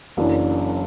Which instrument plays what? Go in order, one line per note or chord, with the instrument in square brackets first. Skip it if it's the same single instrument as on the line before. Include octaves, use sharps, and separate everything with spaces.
[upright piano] F#1 F#2 E3 D4